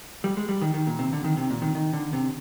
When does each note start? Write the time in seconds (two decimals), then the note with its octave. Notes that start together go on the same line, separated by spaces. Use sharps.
0.24 G3
0.37 G#3
0.49 G3
0.61 D#3
0.74 D#3
0.87 A#2
0.99 C3
1.13 D3
1.24 D#3
1.37 C3
1.50 A#2
1.62 D#3
1.75 D#3
1.93 D3
2.13 C3